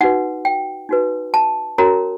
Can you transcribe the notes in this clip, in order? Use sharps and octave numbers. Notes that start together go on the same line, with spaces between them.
D#4 F#4 B4 F#5
G5
D#4 F#4 B4
A5
C#4 F#4 A#4 C#5 A#5